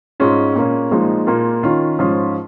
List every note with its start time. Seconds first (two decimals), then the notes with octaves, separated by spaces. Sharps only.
0.20 G#2 G#3 C#4 F4
0.56 A#2 A#3 C#4
0.91 A#2 F3 G#3 D#4
1.27 A#2 A#3 F4
1.63 D#3 C#4 F4
1.99 G#2 F3 C#4 F4